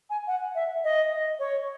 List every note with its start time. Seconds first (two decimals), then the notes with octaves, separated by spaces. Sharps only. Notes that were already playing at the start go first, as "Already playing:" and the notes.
0.10 G#5
0.27 F#5
0.55 E5
0.84 D#5
1.39 C#5